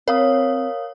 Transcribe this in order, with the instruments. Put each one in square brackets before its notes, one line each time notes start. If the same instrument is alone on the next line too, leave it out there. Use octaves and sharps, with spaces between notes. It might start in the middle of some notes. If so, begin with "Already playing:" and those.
[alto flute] C4 [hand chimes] A#4 F5 D#6 [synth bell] C#5